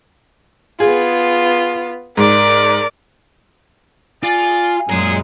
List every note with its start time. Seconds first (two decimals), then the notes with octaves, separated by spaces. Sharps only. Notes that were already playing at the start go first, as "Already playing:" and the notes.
0.80 B3 F4 G#4
2.17 G#2 A#4 D5
4.23 F4 D5 G#5
4.89 F#2 A#2 G#3 G#4 A#4